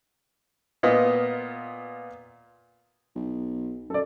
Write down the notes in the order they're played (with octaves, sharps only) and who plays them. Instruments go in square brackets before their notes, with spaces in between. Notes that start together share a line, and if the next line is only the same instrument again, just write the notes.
[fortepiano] A#2 B3 F4 D#5
[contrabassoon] B1
[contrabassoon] F#2 [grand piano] A4 D5